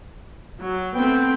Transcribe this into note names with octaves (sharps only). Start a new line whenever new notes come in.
F#3
A3 B3 C4 G5